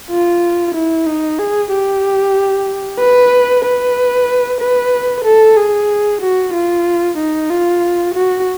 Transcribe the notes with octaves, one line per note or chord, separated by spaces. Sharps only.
F4
E4
D#4
G#4
G4
B4
B4
B4
A4
G#4
F#4
F4
D#4
F4
F#4